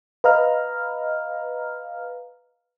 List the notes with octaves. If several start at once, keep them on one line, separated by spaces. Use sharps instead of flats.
B4 D#5 F5 A#5 F6